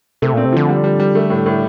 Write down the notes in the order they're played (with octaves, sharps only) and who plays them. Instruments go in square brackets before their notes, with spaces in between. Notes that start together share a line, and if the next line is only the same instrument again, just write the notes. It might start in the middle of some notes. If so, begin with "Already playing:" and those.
[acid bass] C3 [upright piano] A3
[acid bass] A#2 [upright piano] C4
[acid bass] C3
[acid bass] D3 [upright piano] F3
[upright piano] G3
G3
G3
A3
A2
A2